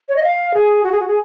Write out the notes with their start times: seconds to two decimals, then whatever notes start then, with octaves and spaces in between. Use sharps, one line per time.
0.09 C#5
0.16 D#5
0.23 F5
0.54 G#4
0.84 F#4
0.92 G#4
1.00 F#4
1.08 G#4